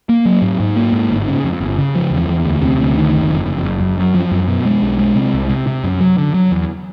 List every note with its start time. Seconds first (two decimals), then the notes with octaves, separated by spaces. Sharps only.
0.09 A#3
0.26 F#3
0.42 G#2
0.60 G#2
0.76 A#3
0.93 G#2
1.10 G1
1.28 C#3
1.44 F2
1.61 G1
1.78 C#3
1.95 F3
2.11 E2
2.28 E2
2.45 D2
2.62 C3
2.79 D2
2.97 D#3
3.13 F#1
3.30 F2
3.46 F#1
3.63 F#1
3.81 F#2
3.98 F#2
4.14 F3
4.32 F#2
4.48 B2
4.65 G#3
4.82 B1
4.99 G#3
5.15 C3
5.34 C2
5.49 C3
5.67 C3
5.84 F#2
6.01 F#3
6.18 D3
6.34 F#3
6.52 E2